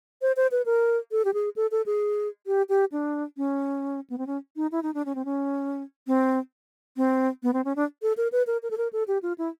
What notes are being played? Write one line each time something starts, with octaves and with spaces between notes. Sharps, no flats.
C5
C5
B4
A#4
A4
G4
G#4
A4
A4
G#4
G4
G4
D4
C#4
B3
C4
C#4
D#4
E4
D#4
D4
C#4
C4
C#4
C4
C4
B3
C4
C#4
D4
A4
A#4
B4
A#4
A#4
A4
A#4
A4
G4
F4
E4